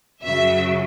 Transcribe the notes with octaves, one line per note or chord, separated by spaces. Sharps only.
F#2 C#3 F#3 E5